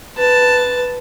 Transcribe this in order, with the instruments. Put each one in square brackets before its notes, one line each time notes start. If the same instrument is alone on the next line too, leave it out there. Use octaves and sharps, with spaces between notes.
[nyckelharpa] B4 A5